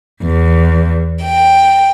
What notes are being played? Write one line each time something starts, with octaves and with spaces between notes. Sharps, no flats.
E2
G5